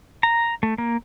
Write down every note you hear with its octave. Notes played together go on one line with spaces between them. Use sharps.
A#5
A3
A#3